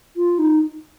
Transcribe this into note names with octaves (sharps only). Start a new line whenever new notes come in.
F4
D#4